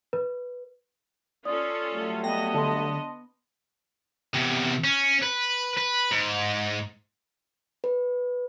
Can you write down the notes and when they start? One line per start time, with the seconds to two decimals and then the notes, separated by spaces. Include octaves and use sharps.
0.13 B4
1.45 C#4 F4 A4 D5 D#6
1.93 F#3 G3 A3
2.24 B3 D#5 G5 A#6
2.54 D3 A5 C6
4.34 E2 C3
4.84 C#4
5.23 B4
5.77 B4
6.11 G#2
7.84 B4